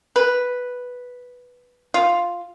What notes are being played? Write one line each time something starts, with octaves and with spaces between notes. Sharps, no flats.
B4
F4